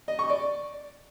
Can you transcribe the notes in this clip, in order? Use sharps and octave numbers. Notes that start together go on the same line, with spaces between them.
D#5
C#6
D5